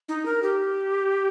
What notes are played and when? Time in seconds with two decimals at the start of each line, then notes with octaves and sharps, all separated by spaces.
0.09 D#4
0.26 A#4
0.43 G4